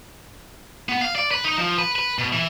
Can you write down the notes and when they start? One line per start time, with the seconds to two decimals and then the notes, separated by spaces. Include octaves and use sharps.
0.89 B3
1.01 F5
1.16 D5
1.31 B4
1.45 D#4
1.58 F3
1.78 B4
1.96 B4
2.19 B2
2.33 E3